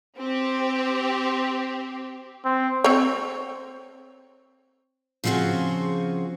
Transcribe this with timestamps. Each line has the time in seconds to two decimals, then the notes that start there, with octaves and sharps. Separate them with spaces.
0.18 C4 G4
2.45 C4
2.84 C4 C#5
5.24 C#3 F3 C4 F4 F#4 G#4